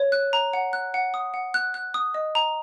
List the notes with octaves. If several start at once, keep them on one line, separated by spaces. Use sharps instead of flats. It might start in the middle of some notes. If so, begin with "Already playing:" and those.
Already playing: C#5
F#6
A#5
F#5
F#6
F#5
D#6
F#5
F#6
F#6
D#6
D#5
A#5